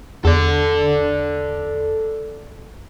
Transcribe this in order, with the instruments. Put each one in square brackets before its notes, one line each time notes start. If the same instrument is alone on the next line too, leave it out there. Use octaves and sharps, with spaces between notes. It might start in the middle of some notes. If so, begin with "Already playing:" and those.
[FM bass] E2 [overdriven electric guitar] A4 D5